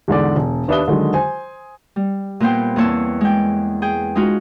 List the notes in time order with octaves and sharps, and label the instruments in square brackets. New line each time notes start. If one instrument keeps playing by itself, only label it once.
[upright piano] E2 G#2 D3 D5
E1
D#2 D4 B4 E5 D#6 G7
D3 D#3 F#3 G#3
C5 G#5
[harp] G3
A#2 A#3 B3 C5 G5
E2 A#3 C4 C#5 A5 E6
G#3 G5
G#4 G5
G#3 C#4 D#4 F4 F#4